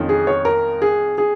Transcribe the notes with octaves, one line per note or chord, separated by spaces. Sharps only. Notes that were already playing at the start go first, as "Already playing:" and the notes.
Already playing: F2 D#3 C#4 F4
G#4
C#5
A#4
G#4
G#4